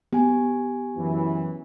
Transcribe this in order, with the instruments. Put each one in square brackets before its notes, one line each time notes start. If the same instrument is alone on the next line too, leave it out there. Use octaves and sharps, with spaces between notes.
[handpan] B3 [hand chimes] G4 G#5
[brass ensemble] F#2 E3